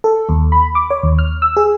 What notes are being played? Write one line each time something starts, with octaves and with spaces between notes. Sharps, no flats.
A4
D#2
B5
D6
C#5
D#2
F6
E6
G#4